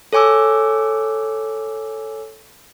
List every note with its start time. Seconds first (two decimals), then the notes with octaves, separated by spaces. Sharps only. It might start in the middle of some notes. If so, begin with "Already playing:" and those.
0.13 A4 C#5 G#5 D6 E6